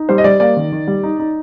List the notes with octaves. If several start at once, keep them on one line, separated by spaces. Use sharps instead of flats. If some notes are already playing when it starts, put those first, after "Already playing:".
Already playing: D#4
G3 C5
D#5
G3 D5
A#3 D5
D#3
D#3
G3
D#4
D#4